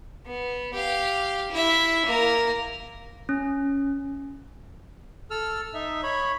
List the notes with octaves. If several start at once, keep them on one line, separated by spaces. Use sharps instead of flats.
B3
G4 F5
E4 E5
A#3 A#4
C#4
A4 E6 F6
D#4 E5
C#5 B5